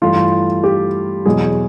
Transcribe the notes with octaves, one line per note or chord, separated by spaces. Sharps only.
G2 E3 A3 F4
G4
E2 B2 F#3 G#4